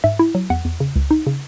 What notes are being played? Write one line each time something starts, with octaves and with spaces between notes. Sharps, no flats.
G#2 E5
E4
F#3
E2 F#5
E2
C#3
C#2
D#4
C#3